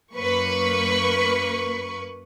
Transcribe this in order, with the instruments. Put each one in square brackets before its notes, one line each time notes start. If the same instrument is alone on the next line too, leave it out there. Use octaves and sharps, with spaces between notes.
[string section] F#2 A#3 B4 C#6